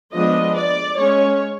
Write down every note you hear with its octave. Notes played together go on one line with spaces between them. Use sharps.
F3 G#3 B3 D4 D#5
D5
G#3 C#4 C#5